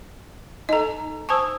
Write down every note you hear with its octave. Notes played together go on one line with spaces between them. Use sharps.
D#4 A4 D#5 A#5
C5 G#5 A5 C#6 D#6 E6